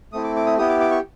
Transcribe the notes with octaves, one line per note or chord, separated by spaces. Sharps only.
A3 C4 E4 D#6
D6
D6
D#6
B3 E4 G4 D#6
D6
D6
C#6